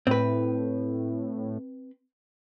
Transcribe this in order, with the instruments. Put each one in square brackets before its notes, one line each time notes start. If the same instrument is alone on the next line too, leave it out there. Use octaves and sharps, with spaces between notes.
[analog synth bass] A2 [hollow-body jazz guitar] C4 B4